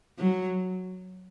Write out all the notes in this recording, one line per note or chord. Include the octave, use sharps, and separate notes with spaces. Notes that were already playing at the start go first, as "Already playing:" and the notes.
F#3